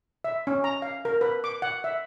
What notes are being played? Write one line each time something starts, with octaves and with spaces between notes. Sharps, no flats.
E5
C#4
A#5
F5
A#4
B4
D6
F#5
E5